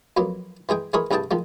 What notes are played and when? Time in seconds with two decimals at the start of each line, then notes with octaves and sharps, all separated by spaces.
0.17 F2 F#3 A#3 B3
0.69 E3 G#3 G#4 G5
0.93 E3 G#3 G#4 A#4 C#5 B5
1.11 C2 G2 E4 G#4 G5 A5
1.31 D#3 F3 G#3